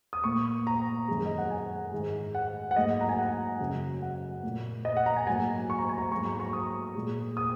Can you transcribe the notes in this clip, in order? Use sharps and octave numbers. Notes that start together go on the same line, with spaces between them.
D#6
A#2 A#3 C#6
A#5
F#2 D#3 G#3
D#5
F#5
G#5
G#2 D#3 G#3
F#5
F#5
G#2 F#3 A#3 D#5
A#5
G#5
F#5
F#2 C#3 F#3
F#5
A#2 A#3
D#5
F#5
A#5
G#5
G#2 F#3 A#3 G#5
C#6
A#5
G#5
A#5
G#2 F#3 A#3 C#6
A#5
C#6
D#6
A#2 G#3
D#6